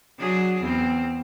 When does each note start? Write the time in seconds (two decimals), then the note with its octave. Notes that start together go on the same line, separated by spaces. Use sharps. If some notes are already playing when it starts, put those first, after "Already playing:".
0.19 F#3 D4 G#4
0.61 E2 C4